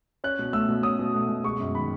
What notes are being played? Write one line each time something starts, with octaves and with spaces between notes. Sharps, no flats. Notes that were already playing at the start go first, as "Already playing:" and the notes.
C#4 F#6
B2
A3 E6
B2
C#4 D#6
B2
A3
B2
G#3 C#6
F#2
D#3 B5